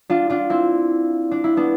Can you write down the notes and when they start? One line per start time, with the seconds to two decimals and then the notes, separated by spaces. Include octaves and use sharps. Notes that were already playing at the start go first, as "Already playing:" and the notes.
0.10 D4 F4
0.30 D4 F4
0.50 C4 E4
1.31 D4
1.44 E4
1.57 B3 D4